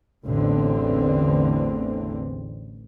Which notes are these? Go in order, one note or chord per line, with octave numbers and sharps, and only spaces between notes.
A1 E2 A2 D3 C4